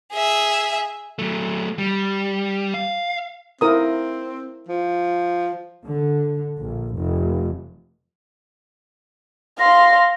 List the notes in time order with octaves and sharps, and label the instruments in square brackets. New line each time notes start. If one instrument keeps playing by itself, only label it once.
[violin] G#4 E5
[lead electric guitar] F#3 A3
G3
F5
[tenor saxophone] C4 [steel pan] E4 A#4 D#6
[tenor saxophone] F3
[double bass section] D3
A#1
F1
[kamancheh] F5 C6 [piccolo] A#6